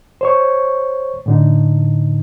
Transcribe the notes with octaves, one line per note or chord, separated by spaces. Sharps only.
C5 C#5 C#6
A2 D3 D#4